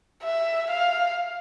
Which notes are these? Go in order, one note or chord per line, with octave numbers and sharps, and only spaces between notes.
E5
F5